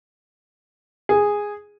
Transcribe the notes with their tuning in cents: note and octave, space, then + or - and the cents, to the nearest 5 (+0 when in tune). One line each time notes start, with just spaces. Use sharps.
G#4 -10